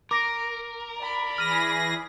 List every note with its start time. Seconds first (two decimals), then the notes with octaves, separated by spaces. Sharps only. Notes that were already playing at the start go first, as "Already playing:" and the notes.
0.11 A#4 D6 A#6 D7
0.98 D5 B5
1.38 E3 G#4 F6 A#6 D#7